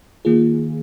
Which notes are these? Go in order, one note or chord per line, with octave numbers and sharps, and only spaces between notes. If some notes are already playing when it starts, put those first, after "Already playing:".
D#3 A#3 F4 G#4